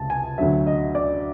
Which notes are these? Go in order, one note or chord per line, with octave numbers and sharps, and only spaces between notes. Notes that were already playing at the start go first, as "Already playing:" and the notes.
Already playing: C#2 C3 A5
G#5
D2 D3 F#3 E5
D#5
D5